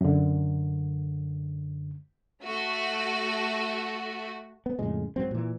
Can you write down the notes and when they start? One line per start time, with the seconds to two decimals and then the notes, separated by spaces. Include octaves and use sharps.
0.01 F#2 D3
2.44 A3 F#4
4.66 B3
4.79 F2 A2 C#3 G#3
5.16 G#2 F#3 C4
5.31 A#2 E3